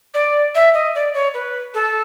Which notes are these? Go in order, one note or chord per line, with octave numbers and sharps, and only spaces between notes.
D5
E5
D#5
D5
C#5
B4
A4